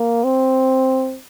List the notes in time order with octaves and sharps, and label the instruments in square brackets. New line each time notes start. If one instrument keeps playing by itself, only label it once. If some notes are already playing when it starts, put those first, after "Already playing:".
Already playing: [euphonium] A#3
C4